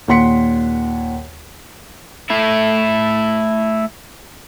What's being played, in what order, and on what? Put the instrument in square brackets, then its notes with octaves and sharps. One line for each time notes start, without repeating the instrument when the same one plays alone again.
[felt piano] D#2 A#2 F#5 C6 B6 C#7
[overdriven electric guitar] A3 E4